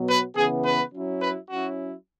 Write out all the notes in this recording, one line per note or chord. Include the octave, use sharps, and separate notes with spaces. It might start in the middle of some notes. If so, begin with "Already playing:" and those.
Already playing: B2 F#3 B3
B4
C#3 E3 B3 G#4
B4
F#3 C#4 E4
B4
F#3 C#4 E4 F#4